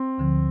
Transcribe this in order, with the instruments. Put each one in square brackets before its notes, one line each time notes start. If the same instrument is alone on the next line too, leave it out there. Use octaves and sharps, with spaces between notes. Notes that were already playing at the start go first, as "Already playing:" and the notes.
Already playing: [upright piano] C4
[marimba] D2 D3 F3